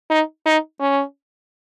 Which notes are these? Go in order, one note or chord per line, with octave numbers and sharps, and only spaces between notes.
D#4
D#4
C#4